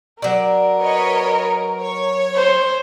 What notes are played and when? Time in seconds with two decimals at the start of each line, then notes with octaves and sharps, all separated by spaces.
0.22 F#3 A#4 D5
0.80 B4 C#5 D#5
1.81 C#5
2.36 C5